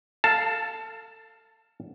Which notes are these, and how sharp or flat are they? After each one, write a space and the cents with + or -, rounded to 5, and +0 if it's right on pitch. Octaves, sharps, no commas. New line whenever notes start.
A4 +25 F5 +0 A5 +0